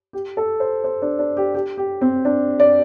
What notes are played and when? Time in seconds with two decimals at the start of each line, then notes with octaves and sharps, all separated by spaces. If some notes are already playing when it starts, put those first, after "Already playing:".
0.13 G4
0.37 A4
0.60 C5
0.84 C5
1.02 D4
1.19 D4
1.37 G4
1.55 G4
1.78 G4
2.01 C4
2.25 D4
2.60 D5